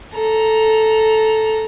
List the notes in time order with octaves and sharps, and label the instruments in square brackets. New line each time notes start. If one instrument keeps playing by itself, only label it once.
[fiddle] A4 A#5